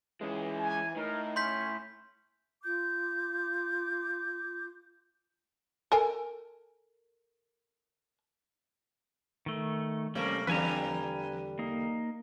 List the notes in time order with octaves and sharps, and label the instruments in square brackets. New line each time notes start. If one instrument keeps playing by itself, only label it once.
[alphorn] E3 [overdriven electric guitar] G#3 C#4
[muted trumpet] G#5
[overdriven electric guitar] A2 [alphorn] D#4 [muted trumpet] A#4
[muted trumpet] C#4 [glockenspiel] C6 G6 B6
[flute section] F4 D6 G6
[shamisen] A4 A#4 G#5
[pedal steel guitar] D#3 A3
[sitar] C3 A3 A#3 [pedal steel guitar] G3 C#4
[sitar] E2 D3 G3 [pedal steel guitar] B4 G#5 A#5
[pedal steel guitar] A#3 D#4